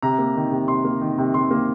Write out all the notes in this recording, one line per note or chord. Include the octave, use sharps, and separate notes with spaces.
C3 A#5
A#3
D#3
C3
C3 C6
A#3
D#3
C3
C3 C6
A#3